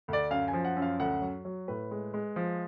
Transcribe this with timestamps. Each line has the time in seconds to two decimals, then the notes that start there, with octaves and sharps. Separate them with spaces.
0.08 D2 D5
0.30 F#2 F5
0.48 G#5
0.53 F3
0.65 F#5
0.77 F#2
0.82 F5
0.99 D2 F#5
1.22 F#3
1.45 F#3
1.68 A2 B4
1.91 G#3
2.14 G#3
2.36 F3